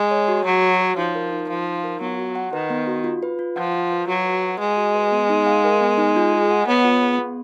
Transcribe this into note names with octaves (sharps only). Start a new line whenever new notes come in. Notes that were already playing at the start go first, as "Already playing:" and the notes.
Already playing: G#3
C#5
F#4
F#3 F#5
F#4
C#5
F3 D#4
A#4
D#4
F3 F5
D#4
A#4
F#3 B3
F#4
F#5
D#3 B4
B3
F#4
F4
B4
F4
F3 F#5
F4
B4
F#3 F#4
B4
F#5
G#3 D#5
F#4
B4
B3
D#4
F5
A#4
B3
D#4
F4
G#4
F#5
B3 C#5
F4
G#4
B3